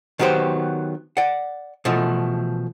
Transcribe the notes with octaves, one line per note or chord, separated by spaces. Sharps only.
D#3 F#3 B3 G4 C5
D5 F#5
B2 E3 F3 A3